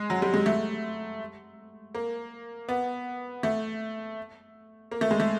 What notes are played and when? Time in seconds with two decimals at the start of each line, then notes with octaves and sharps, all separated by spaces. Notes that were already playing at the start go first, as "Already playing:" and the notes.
Already playing: G#3
0.10 F#3
0.22 G3
0.34 G#3
0.46 A3
1.95 A#3
2.68 B3
3.43 A3
4.91 A#3
5.01 A3
5.11 G#3
5.20 A3